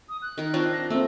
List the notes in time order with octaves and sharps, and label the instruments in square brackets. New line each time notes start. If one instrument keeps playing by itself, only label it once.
[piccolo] D#6
F#6
[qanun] D#3 A#4
[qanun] C4 D4 F4 [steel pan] C#5
[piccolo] A#6
[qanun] A3 [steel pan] A#3 C4 [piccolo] E6